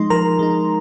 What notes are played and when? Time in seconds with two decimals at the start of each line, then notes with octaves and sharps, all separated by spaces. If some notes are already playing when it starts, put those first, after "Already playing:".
Already playing: F3 G#3 D#4 C6
0.10 F3 A#4 A#5
0.39 G#3 D#4